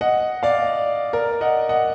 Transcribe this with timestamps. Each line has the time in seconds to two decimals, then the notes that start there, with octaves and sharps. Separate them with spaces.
0.01 D#5 F#5
0.43 D5 F5
1.13 A#4 D5
1.41 D#5 F#5
1.69 D#5 F#5